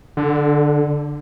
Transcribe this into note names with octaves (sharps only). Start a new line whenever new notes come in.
D3